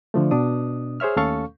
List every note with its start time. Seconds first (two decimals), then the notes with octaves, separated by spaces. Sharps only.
0.14 D3 F3 A3
0.31 B2 D4 D#6
1.00 G#4 C5 C#5 E5 F6
1.16 D#2 A3 C#4 A4 F5 C#6